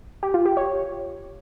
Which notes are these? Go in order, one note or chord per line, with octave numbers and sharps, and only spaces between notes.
G4
F4
G4
C#5